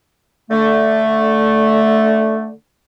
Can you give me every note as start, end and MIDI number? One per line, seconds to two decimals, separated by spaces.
0.51 2.52 50
0.51 2.52 57